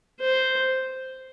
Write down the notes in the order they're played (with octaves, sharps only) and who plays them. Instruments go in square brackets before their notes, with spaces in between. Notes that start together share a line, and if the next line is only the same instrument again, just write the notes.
[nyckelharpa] C5